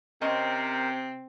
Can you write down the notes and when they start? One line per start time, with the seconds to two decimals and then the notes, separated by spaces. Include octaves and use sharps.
0.21 C3 C4 C#4 A#4 C5 D#5